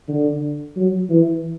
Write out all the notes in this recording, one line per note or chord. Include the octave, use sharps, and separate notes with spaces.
D3
F#3
E3